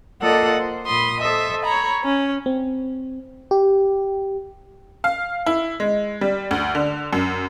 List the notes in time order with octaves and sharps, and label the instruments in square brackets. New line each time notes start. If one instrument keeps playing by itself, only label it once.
[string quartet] A#3 F4 A4 D5 D#5 F#5
C5
A#2 B5 C6 D#6
A4 C5 D#5 E5
C#5 A#5 B5
C#4
[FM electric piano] C4
G4
[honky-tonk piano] F5
E4
G#3
G3
D2
D3
F#2